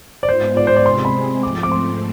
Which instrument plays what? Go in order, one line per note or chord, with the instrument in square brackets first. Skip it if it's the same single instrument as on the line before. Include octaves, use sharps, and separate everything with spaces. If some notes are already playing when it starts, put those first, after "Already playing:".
[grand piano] D5
[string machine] G#2 G#3 B3 F4 [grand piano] C5
[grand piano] D5
C5
D5
[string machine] C3 G#3 C4 G#4 [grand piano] C6
[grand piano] B5
[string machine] G#2 F3 A3 C4 [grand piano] D6
[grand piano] D6
C6